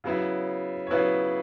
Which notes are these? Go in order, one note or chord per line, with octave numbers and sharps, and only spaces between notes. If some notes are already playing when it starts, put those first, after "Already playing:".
C#3 F#3 B3 E4
C#5
C#3 F#3 B3 E4 B4